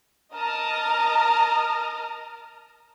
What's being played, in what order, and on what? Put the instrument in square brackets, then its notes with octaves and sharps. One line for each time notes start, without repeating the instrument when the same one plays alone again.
[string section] A#4 D#5 A5 A#5 D#6 F6